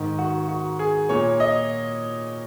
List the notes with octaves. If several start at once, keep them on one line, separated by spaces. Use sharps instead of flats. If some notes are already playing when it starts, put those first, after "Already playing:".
Already playing: G#2 D#3
F#4
F#4
G#4
A#2 C#5
D#5